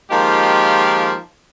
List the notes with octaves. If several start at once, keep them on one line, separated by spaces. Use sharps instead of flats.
D#3 F3 G#3 A#3 F4 G4